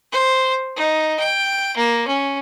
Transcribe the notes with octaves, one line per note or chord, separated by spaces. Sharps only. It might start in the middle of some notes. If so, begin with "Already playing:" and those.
C5
D#4
G5
A#3
C#4